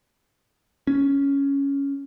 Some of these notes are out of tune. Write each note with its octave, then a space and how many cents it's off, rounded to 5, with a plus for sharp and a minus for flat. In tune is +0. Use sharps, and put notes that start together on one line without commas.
C#4 +5